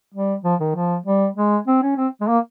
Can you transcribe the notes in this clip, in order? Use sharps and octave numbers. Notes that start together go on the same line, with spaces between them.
G3
F3
D#3
F3
G3
G#3
C4
C#4
C4
G#3
A#3